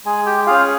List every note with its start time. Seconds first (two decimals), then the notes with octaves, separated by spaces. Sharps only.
0.05 G#3 G#4 G#5
0.26 G4 G5
0.46 C#4 F4 G#4 F5